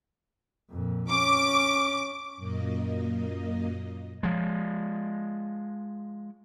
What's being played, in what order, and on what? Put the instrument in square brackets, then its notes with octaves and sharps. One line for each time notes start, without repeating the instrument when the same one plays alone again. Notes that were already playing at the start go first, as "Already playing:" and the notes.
[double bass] F2 A#2
[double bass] C#4 [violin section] D6
[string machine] F#2 A#2 A#3 D#5
[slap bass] F3 G#3